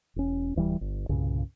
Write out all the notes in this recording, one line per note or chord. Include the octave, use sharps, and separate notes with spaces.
E1 C#4
D1 E3 G3
G1
C2 G2 A#2 C#3